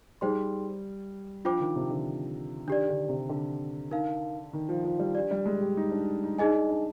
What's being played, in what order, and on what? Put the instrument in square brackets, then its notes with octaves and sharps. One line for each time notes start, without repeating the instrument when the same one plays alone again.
[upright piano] G3 [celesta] D#4 G#4 C5 G5 C6
[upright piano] F3 [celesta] D4 F4 C5 G5 D6
[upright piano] D#3
C3
D3
[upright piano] D#3 [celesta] D4 G4 D5
[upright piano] D3
C3
D3
[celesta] D#4 A#4 F5
[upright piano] D#3
F3
F3
G3
[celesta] D4 G4 D5
[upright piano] G3
G#3
G4
D#4
D4
D#4
[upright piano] D4 [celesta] D#4 G#4 D#5 G#5
[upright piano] D4
D4